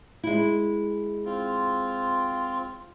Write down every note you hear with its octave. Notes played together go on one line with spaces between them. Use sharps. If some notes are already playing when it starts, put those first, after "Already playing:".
G#3 E4
C4 F4